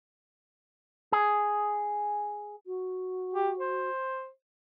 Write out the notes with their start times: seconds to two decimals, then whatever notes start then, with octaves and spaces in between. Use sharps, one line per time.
1.12 G#4
2.66 F#4
3.33 G4
3.59 C5